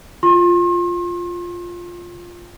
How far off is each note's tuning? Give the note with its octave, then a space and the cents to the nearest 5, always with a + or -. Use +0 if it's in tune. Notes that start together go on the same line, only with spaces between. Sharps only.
F4 +0 C6 +40